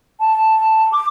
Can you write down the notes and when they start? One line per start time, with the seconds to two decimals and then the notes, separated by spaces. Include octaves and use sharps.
0.19 A5
0.92 D6